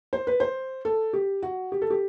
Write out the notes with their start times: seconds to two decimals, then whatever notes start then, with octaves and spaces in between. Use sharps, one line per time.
0.13 C5
0.27 B4
0.40 C5
0.85 A4
1.13 G4
1.43 F#4
1.72 G4
1.82 A4
1.90 G4